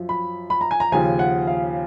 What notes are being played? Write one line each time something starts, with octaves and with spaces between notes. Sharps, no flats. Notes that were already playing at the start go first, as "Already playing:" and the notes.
Already playing: F#2 F3
B5
B5
A#5
G#5
A#5
D#2 C#3 F3 G#5
F#5
F5